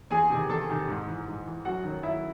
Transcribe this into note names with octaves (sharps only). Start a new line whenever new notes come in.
E2 G#4 G#5
C3 D#3
E2 A4 A5
C3 D#3
G#2
E3
G#2
E3
F#2 F#4 F#5
D#3 F#3
F#2 E4 E5